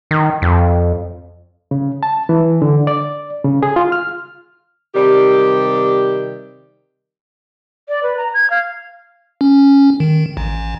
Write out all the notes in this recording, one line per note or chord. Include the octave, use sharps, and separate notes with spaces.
D#3
F2
C#3
A5
E3
D3
D5
C#3
G#4
F4
F6
C3 D#3 G3 G4
D5
B4
A#5
G#6
F5
C#4
D#3
A1